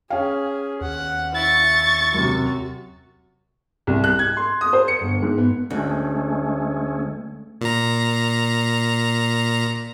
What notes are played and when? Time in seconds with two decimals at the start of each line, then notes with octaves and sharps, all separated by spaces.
0.10 C#4 G#4 F5
0.81 D#2 F#5
1.34 E4 C#6 A6
2.14 F#2 C3 F#4
3.87 C2
4.04 F#6
4.19 G#6
4.37 C6
4.61 D#6
4.73 C5
4.88 C#7
5.01 G1
5.22 G#2
5.38 B3
5.70 D2 G#3 A3 C#4
7.61 A#2 A#5